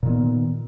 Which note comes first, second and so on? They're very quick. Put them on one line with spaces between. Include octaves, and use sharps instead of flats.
A#2 D#3 B3